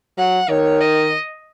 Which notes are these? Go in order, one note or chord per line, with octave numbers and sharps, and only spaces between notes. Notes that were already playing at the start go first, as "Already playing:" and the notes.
F#3 F#5
D#3 C#5
D#5